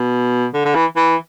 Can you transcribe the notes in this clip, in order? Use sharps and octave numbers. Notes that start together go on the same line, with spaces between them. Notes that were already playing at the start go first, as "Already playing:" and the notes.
Already playing: B2
D3
D3
E3
E3